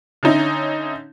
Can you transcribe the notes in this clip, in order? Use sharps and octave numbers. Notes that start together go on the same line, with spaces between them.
D3 C#4 D#4 E4